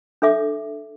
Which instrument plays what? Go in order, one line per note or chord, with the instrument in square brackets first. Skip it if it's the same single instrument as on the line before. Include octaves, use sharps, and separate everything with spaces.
[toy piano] D4 A4 E5 D6